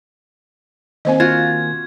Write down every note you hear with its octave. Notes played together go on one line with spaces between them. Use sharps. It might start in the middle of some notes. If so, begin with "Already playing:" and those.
D#3 A#3 C4 C5 D#5 G#5
F4 F#4 G#6